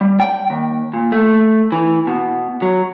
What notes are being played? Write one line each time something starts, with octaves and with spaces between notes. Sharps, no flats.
G3
G5
D#2
A#2
A3
E3
B2
F#3